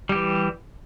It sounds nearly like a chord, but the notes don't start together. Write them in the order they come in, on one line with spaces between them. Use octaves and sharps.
G3 G4 E3